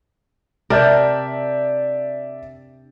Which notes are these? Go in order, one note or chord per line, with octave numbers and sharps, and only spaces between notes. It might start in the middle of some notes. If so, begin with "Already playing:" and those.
C3 D4 A#4 D5 E5 G6